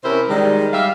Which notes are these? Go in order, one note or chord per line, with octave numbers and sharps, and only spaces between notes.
C3 C#4 E4 A#4 C5
D#3 G3 G#3
G3 G#3 E5 F5